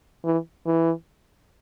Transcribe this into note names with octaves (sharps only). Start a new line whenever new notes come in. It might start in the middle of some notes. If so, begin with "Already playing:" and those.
E3
E3